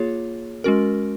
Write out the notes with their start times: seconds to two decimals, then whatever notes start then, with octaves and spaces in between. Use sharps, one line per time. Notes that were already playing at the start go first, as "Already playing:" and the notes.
Already playing: A#3 F4 G#4 C#5
0.64 G#3 C#4 F#4 A#4